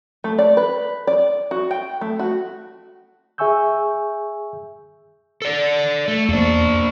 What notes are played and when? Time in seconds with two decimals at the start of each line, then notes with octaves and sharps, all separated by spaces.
0.24 A3
0.38 D5
0.57 B4
1.07 D5
1.51 F#4
1.71 G5
2.01 A3
2.19 F#4
3.38 G#4 E5 G#5 C#6 E6 G6
5.42 A4 D5
6.08 A3
6.29 E2 A#3 D4